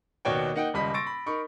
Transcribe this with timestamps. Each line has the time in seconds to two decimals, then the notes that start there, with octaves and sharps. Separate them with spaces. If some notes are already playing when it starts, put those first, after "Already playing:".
0.25 D#2 B2 F#4 C#5 D5 G5
0.54 A#3 D#4 F#5 G5
0.74 D#1 C#2 G3 D#5 B5 B6
0.94 C6 C#6 E6 A6 A#6 D7
1.07 B5
1.26 D#4 A#4 B5 C#6